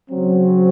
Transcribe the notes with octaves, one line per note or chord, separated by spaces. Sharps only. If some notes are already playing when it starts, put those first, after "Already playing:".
C#3 F#3 C4